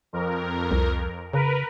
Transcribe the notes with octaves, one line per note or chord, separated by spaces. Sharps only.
F2 A#4
C2
C#3 A#4 B4